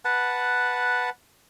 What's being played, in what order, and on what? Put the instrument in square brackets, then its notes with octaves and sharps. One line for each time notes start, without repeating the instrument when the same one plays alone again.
[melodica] B4 F#5 A5